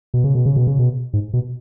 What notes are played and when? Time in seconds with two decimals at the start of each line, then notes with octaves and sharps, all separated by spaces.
0.14 B2
0.24 C#3
0.35 B2
0.46 C#3
0.56 B2
0.67 C#3
0.79 B2
1.13 G#2
1.33 B2